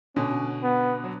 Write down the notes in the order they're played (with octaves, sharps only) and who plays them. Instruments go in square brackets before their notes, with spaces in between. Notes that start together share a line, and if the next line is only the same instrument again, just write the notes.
[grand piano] B2 D3 [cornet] C#4
[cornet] B3
[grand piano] F#3